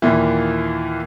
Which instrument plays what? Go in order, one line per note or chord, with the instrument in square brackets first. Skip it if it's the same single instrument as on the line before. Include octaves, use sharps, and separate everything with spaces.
[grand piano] D#2 A#2 E3